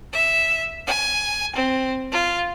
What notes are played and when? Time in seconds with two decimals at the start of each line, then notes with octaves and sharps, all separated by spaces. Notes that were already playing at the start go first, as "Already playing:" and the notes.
0.12 E5
0.86 G#5
1.55 C4
2.10 F4